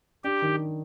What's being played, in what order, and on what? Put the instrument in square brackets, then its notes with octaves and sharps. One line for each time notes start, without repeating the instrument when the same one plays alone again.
[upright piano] D4 [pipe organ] G4
[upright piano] D#3